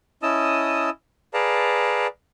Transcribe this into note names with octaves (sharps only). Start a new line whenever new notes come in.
C#4 E4 D#5 A5 D#6 E6
G#4 B4 D5 F5 A5 A#5